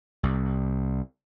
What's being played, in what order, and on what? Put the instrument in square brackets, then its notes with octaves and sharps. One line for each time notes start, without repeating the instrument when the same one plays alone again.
[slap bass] C2